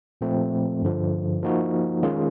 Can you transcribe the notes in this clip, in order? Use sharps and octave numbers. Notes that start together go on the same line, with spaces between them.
A#2 F3 A3 C4
G2 D3 F3
F3 A#3 D#4 F#4
D#3 G#3 C#4 F4 G#4